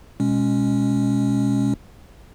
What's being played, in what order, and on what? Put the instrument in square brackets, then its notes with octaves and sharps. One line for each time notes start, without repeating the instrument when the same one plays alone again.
[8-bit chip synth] B2 G#3 C#4